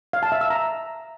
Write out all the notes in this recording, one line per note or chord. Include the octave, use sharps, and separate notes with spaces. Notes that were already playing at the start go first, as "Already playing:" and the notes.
F5
A5
E5
E6
A#5